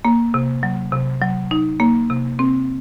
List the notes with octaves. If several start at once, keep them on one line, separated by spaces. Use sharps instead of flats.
A#3
C3
F#3
C3
F#3
D#4
A#3
C3
C4